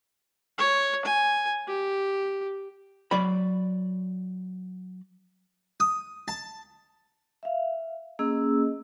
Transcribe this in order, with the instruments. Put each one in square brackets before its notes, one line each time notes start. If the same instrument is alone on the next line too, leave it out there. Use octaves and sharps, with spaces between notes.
[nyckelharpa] C#5
G#5
G4
[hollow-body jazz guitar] F#3 D5 B5
[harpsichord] D#6
A5
[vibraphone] E5 F5
A#3 C#4 G#4 D#5 E6